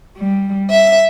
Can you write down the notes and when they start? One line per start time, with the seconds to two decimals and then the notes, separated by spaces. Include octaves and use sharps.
0.16 G3
0.69 E5